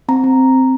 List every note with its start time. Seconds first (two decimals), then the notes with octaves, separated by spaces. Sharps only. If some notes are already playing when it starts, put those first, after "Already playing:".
0.08 C4 A#5
0.24 C4